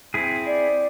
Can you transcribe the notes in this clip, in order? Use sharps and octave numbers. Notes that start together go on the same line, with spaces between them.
C4 E4 G#4
D5